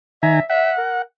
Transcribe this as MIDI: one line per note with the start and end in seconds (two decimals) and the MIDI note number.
0.23 0.40 51
0.23 0.44 76
0.23 0.40 80
0.23 0.40 82
0.50 0.72 76
0.50 1.02 78
0.78 1.02 70